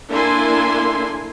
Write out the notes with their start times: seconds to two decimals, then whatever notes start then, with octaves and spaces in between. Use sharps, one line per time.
0.11 A#3 D4 E4 A4 G#5 C6